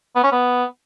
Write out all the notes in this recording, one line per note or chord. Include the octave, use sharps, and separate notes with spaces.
B3
C#4
B3